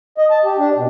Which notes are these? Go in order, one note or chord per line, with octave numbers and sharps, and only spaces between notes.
D#5
A5
G4
D4
B2